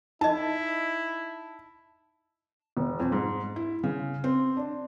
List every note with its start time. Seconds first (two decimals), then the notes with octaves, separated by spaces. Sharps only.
0.21 D#4 E4 D#5 A5
2.77 E1
3.00 F2
3.12 G#2
3.56 E4
3.84 C#3
4.24 C4
4.57 D4